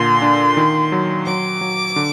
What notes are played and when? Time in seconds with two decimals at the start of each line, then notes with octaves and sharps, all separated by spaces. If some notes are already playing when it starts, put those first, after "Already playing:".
Already playing: A#2 D3 C6
0.22 D4
0.57 D#3
0.92 F#3
1.26 F#3 D6
1.61 F#3
1.96 D3